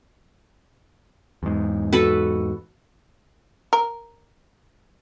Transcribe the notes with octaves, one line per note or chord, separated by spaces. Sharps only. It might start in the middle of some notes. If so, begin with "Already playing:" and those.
E2 G#2
F#4 A4 B4
A#4